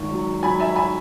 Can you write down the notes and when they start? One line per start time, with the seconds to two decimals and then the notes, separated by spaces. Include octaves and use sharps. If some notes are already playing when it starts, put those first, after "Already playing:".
Already playing: G#1 D#3 C#6
0.11 F#3
0.43 F#3 G#5 B5
0.60 E5 G#5
0.76 G#5 B5